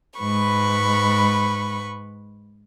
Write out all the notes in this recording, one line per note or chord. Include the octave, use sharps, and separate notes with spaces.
G#2 G#3 B4 B5 C#6